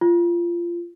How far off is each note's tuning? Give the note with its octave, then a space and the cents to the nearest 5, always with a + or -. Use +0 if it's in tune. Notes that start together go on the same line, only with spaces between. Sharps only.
F4 -20